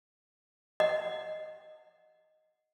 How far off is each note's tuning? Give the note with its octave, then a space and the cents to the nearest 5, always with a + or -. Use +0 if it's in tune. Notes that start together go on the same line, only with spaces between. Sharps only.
D#5 +0 F#5 -10